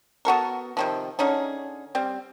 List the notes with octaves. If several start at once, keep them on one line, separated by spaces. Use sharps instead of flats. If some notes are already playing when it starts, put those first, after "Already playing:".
B3 F#4 A4 A#4
C3 D#3 F3
D3 C#4 D#4 G#4
G3 C4